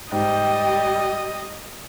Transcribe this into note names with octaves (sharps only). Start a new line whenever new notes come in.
G#2 G3 D#5 G5